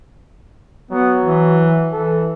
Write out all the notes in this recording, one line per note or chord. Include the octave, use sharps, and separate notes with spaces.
F#3 B3
E3
E3 A4